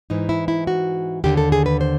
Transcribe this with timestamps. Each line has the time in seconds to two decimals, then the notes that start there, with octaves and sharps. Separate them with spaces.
0.10 G#2 E3 D#4
0.29 E4
0.48 E4
0.67 F#4
1.24 D#2 D3 G4
1.37 A4
1.52 G#4
1.66 B4
1.81 C5